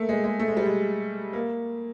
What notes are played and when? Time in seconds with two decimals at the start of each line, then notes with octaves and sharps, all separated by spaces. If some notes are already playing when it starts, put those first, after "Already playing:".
Already playing: A3 A#3
0.09 G#3
0.24 G#3
0.40 A3
0.48 G#3
0.57 G3
0.65 G#3
1.33 A#3